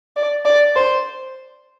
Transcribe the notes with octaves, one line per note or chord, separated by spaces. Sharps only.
D5
D5
C5